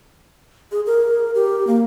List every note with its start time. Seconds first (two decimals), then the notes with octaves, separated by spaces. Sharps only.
0.72 G#4
0.86 A#4
1.35 G4
1.67 A#3